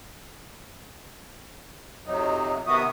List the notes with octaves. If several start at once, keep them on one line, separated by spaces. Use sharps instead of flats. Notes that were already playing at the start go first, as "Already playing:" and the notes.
F2 C3 F#3 D#4
C3 D#3 B3 F#4 E5 D#6